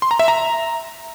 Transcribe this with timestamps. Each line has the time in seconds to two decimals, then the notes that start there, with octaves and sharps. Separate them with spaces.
0.02 C6
0.11 A#5
0.19 E5
0.28 A#5